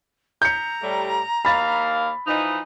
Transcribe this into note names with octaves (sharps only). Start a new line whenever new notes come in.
A#5 G6 C#7
A2 G3
D#2 A#3 F5 B5 A6
E3 F3 D#4